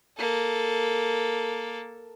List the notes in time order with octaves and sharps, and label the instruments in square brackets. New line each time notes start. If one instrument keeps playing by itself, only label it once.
[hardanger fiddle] A#3 A4